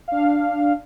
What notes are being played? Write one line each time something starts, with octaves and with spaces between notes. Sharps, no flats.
D4 F5